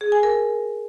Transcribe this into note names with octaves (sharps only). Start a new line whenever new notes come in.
G#4
G#5
A#4